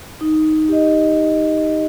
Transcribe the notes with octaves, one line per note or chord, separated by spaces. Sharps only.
D#4
G4 D#5